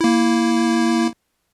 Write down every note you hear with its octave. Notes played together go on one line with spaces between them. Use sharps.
A#3 E4